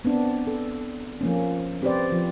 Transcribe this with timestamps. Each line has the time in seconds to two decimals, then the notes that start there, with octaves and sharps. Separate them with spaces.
0.05 B3 C4 D4
0.47 A4
1.21 F3 A#3 C#4
1.82 C4 G4 B4 C5 D5
2.12 F3